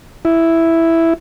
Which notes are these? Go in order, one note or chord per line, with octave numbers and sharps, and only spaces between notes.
E4